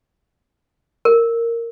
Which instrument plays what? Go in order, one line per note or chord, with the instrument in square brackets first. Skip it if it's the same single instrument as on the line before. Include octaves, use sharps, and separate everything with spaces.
[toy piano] A#4